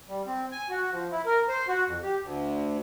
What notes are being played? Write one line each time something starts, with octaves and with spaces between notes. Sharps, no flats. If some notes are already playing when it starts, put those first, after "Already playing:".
G3
C4
G#5
F#4
F3
E4
A#4
C5
F#4
F2
G4
D2